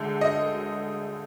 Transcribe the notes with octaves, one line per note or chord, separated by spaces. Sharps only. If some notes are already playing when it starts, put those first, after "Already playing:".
Already playing: D2 D3 G#3
D#5